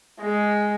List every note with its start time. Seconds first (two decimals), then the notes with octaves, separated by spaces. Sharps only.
0.21 G#3